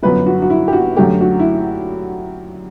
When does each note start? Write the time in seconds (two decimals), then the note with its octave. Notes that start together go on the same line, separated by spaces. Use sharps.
0.03 G1 F#2 F#3 B3 B4
0.26 F#4
0.42 F#4
0.50 E4
0.68 G4
0.73 F#4
0.97 F#2 D3 F#3 A3 G4
1.21 F#4
1.39 E4